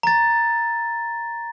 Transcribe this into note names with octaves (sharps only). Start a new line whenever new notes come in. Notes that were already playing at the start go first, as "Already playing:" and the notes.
A#5 A6